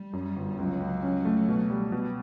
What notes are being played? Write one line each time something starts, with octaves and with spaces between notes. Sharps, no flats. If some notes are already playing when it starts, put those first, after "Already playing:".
Already playing: G3
F#2
G1
C#2 F#3
C#2
C#4
A3
B2
G3
B2